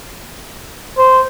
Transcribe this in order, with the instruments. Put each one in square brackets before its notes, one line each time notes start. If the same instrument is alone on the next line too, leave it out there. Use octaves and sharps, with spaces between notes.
[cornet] C5